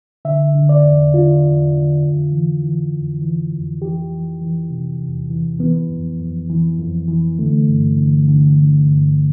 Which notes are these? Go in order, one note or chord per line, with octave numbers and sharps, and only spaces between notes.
D3 E5
D3
D5
E2
D3 F4
E2
D3
F2
E3
E3
F2
E3
F2
E3 G4
E3
E3
C3
E2
E3
E3 B3
F2
F2
E3
F2
E3
D3 A3
G2
D3
D3
D3
G2